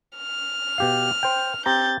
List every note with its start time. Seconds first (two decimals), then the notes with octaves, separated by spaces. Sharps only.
0.17 F6
0.78 B2 G4 F5
1.23 C5 G5
1.66 C4 G4 A#5 G6 A6